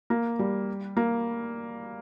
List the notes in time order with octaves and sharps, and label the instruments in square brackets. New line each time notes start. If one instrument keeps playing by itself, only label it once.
[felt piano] A#3
G3
A#3